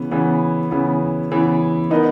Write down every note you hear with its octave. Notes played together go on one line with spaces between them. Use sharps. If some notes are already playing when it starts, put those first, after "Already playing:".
Already playing: C#3 E3 B3
C#3 E3 B3
C#3 E3 B3
C#3 E3 B3
B3 D#4 A#4 D#5